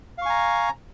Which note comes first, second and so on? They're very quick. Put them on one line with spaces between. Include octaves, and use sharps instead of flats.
F5 C#6 G#5 A#5